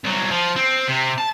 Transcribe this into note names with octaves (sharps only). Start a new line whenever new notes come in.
C2 F#3
F3
C4
C3
A5